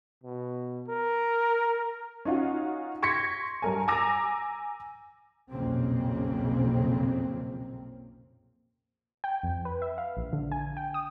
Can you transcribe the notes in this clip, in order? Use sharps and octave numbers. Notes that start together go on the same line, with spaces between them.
B2
A#4
C#4 D#4 F4 F#4
C6 C#6 G#6 A#6 B6 C#7
G2 A#4 G#5
G#5 A#5 D6 E6 A#6
B1 F2 A#2 C#3 A#3 C4
G5
F2
B4
E5
F5
A#1
D3
G#5
G5
D#6